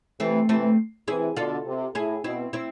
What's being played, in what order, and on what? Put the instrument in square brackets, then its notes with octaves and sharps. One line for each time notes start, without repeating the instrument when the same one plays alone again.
[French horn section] C3 E3 [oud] A3 C4
[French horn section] C3 E3 [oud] A3 C4
[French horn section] C3 E3 [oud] E4 G#4
[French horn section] B2 D3 [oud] F4 A4
[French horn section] C3
[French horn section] A2 [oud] E4 G#4
[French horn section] B2 [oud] C4 E4
[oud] C4 E4